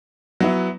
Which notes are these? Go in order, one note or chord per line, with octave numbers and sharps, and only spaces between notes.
F#3 B3 E4